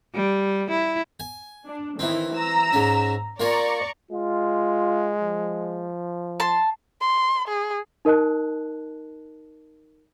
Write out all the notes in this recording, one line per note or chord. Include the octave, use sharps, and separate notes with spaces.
G3
E4
G#5
D4
D#3 E3 C4 E4
A#5 E6
G#2 C#4
A#3 F4 D5 G#5 A#5 C#6
G#3 F4
F3
A5 C6
C6
G#4
D#4 A#4 D#5 A5 F#6